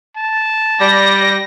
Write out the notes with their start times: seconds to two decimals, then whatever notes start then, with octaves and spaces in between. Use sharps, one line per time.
0.17 A5
0.81 G3 D5 A#6